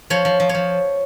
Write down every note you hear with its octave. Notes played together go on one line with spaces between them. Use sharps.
F3 C#5
F3
F3
C#5
F3